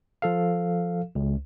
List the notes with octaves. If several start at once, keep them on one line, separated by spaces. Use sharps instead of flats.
F3 A4 F5
C#2